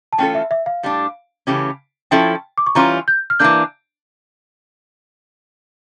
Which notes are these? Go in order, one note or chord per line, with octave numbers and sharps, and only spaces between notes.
A5
E3 A3 C#4 F4 A4 G5
E5
E5
F5
A2 G3 D4
C#3 E3 A3 C#4 G4
F3 C#4 E4 A4 G5
D6
C#6
E3 G3 C#4 F4 A#5
G6
F6
E3 A#3 D4 G6